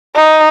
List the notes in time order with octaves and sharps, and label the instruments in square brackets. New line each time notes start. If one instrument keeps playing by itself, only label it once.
[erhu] D#4